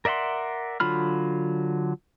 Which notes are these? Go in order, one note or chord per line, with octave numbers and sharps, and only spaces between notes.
A#4 D5 E5 F#5 C6
D3 F#3 F4 B5 F6